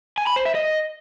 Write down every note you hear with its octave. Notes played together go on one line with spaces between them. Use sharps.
G#5
B5
C5
E5
D#5